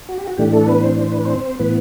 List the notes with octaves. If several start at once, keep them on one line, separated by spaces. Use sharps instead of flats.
F#4
G4
F#4
A2 E3 A3 D4 G4
A3 A4
B3 B4
C4 C5
C5
B4
C4 C5
A2 E3 B3 B4